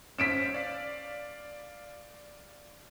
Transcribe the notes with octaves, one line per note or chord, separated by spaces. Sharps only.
C#4 C5 B6 D7 E7
D5 F5